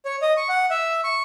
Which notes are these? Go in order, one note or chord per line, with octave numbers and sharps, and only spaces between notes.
C#5
D#5
C#6
F#5
E5
C#6